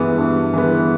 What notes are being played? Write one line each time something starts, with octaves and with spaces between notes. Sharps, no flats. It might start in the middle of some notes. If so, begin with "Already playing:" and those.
Already playing: G2 E3 G#3 B3
G2
E3 G#3 B3